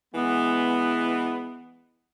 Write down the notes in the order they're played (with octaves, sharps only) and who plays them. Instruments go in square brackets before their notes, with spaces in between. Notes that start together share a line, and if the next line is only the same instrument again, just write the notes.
[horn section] E3 G#3 B3